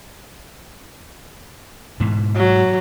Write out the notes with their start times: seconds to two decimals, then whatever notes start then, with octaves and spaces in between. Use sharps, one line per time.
2.00 G#2 B2 E3
2.37 F#3